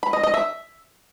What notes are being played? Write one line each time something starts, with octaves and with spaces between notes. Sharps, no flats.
B5
D#5
D#5
E5